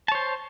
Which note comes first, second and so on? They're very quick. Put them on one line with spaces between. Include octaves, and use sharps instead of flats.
A5 C#5 C5